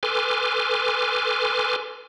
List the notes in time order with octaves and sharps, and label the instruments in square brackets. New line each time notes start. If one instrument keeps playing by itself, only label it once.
[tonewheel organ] A4 B4 G#5 C6 D6 F6